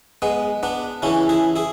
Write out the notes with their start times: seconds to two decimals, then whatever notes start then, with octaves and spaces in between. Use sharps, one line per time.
0.22 G#3 B3
0.63 B3 D4
1.02 C#3 E3 C#4 E4
1.29 E4 G#4
1.56 E4 G#4